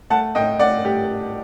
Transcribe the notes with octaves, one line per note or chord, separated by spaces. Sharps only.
A3 F#5 A5
A2 D#5 G5
A2 D5 F#5
A2 G4